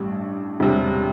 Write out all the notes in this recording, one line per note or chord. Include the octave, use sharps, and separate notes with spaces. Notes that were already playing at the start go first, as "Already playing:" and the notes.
Already playing: A1 G2 G3 D4
E1 D2 C3 G3 D4